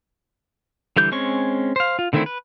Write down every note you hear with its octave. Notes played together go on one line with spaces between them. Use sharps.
D3 E3 G3 G6
G#3 C4 C#4 C#6
C5 F5
F4
D3 D#3 A3 C4 E4
B4